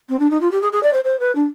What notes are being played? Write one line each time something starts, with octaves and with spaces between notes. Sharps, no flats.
C4
D4
D#4
F4
G4
G#4
G#4
D5
C5
C5
B4
D4